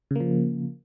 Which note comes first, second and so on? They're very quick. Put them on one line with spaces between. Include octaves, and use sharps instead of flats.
C#3 A#3 F3